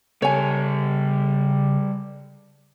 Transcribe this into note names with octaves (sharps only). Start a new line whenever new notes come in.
C#3 G3 A4 C#5 G#5